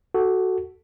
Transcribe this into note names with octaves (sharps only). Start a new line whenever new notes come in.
F#4 A4